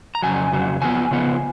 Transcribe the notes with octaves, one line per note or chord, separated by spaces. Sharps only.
A#5
F2 C#3 F#3 G#5
F2 C#3 F#3
C#3 F3 B3 G#5
C#3 F3 B3